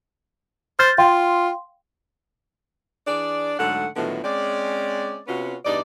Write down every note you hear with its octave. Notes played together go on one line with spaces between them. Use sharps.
C5 F6 G6 A6
F4 F5 G5 C6
E3 D4 G#4 D5
G#2 D3 F#3 A3 F#5
A2 D3 D#3 F3 F#3 B3
G#3 C4 C#4 D5
C3 B3 C#4 F4 F#4
E2 G2 D#4 D5